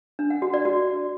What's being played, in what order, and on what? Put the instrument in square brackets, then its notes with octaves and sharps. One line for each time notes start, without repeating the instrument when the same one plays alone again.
[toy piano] D4
F#5
F#4
D5
F#4